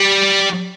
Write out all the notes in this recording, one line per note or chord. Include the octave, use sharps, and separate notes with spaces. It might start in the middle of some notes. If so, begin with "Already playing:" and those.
Already playing: G3